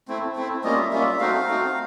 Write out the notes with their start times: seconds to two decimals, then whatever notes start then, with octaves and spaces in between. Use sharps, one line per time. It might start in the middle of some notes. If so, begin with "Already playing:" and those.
0.08 A3 C4 E4
0.36 A3 C4 E4
0.64 G3 A#3 C#4 F4 D#5
0.78 E5
0.92 G3 A#3 C#4 F4 E5
1.20 A3 C4 D#4 F#4 F5
1.48 A3 C4 D#4 F#4